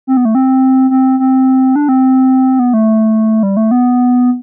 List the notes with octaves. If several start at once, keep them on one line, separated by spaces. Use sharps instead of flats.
C4
B3
A3
C4
C4
C4
D4
C4
B3
A3
G3
A3
B3